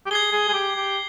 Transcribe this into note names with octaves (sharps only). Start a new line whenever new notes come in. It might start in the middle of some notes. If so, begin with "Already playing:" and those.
G4
G#4 G#6 C7 G7
G#4
G#4
G4
G4